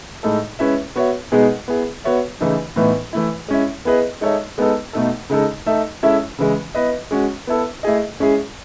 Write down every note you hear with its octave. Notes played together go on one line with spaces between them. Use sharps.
A2 G#3 D#4 A4
G#3 C#4 E4 B4 E5
B3 F#4 C#5 E5
B2 G#3 D#4 G#4 B4
B3 E4 G#4
B3 F#4 C#5 E5
C#3 E3 A3 D#4
A2 E3 B3 D#4
E3 A3 E4
G#3 C#4 E4
B3 E4 G#4 B4 D#5
G#3 D#4 A4 C#5 E5
G#3 B3 D#4 A4
B2 A3 D#4 A4
C#3 G#3 D#4 A4
A3 D#4 A4 E5
G#3 C#4 E4 A4 E5
C#3 E3 G#3
B3 E4 B4 D#5
G#3 C#4 F#4
B3 E4 A4
A3 E4 G#4 D#5
G#3 C#4 E4 G#4